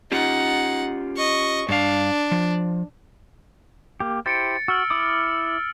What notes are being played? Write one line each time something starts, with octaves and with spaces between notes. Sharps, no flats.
C#4 D#4 F4 G4 F#5
D#5 C#6
G2 D4 F5
F3
A#3 G4
E4 G4 C5 A6 C#7 D7
F#4 E6 F6
E4 D6 D#6